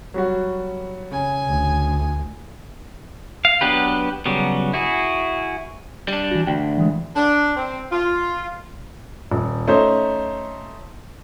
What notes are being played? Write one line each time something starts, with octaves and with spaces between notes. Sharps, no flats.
F#3 G3 F#4
C#3 G#5
D2
F5
F#3 B3 D4 G4 B4
C#3 F#3 G3 B3
E4 F#4 G#4
G3 D4
E3 F#4
D2 G5
E3 G#3
D4
C4
F4
D#1
A3 C#4 D#4 C5